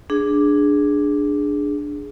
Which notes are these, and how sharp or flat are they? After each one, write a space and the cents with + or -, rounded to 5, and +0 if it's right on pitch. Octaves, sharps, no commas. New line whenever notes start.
D4 +0 G#4 +0